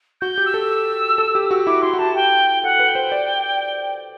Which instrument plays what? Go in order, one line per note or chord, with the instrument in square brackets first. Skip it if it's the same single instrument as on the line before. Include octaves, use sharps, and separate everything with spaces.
[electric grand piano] F#4 [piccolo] G6
[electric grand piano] G4
[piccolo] E6
[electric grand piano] A4
A4
G4
F#4
[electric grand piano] E4 [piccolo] D6
[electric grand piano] F#4 [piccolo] C6
[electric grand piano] F#4
[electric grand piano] G4 [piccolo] A5
[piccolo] G5
[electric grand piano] A4 [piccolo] F#5
[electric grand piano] B4
[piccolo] G5
[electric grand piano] C5
D5